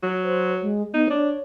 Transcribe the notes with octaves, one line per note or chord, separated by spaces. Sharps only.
F#3
C5
G#3
B3 D#4
D4 C#5